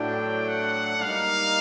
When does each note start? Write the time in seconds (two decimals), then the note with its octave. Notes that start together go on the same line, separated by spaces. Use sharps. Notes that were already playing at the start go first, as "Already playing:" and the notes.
Already playing: A2 F#3 A3 D4 G5
0.48 F#5
1.02 G3 A#3 D#4 F5